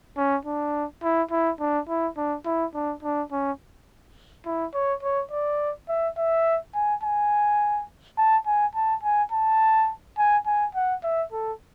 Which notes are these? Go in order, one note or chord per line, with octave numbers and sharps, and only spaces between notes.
C#4
D4
E4
E4
D4
E4
D4
E4
D4
D4
C#4
E4
C#5
C#5
D5
E5
E5
G#5
G#5
A5
G#5
A5
G#5
A5
G#5
G#5
F#5
E5
A4